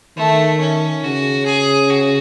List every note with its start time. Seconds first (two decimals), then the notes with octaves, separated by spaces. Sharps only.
0.17 D#3 A3
0.60 C#4
1.03 C#3 F#4
1.46 G#4
1.90 F#4